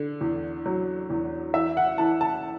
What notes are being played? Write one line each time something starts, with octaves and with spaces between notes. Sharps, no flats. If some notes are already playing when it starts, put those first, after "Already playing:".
Already playing: D3
E2
F#3
E2
E3 E5
F#5
E3 A5
A5